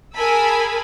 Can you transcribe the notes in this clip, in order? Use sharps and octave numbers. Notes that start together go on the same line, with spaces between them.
G#4 A#4 G#5 A5 B5 E6